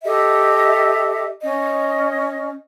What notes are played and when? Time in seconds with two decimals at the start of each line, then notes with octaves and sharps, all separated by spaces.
0.03 G4 A4 D#5 E5
1.42 C#4 D#5